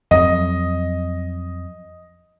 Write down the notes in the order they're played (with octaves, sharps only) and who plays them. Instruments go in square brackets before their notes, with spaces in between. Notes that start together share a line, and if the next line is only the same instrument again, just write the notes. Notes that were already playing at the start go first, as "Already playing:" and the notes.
[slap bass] F2 F#3 [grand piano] D#5